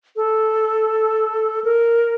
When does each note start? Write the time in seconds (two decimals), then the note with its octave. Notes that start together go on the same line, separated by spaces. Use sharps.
0.16 A4
1.64 A#4